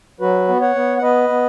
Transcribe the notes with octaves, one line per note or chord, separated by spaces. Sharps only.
F#3 F#4 B4
B3
C#5 F#5
B3
F#5
B3 B4 D#5
B3